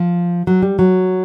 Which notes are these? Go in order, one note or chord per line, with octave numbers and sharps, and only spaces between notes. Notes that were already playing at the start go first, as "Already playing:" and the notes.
Already playing: F3
F#3
G3
F#3